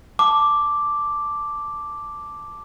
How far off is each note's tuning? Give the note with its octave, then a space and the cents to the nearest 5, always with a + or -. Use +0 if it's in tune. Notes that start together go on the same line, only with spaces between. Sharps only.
A5 +0 D6 +0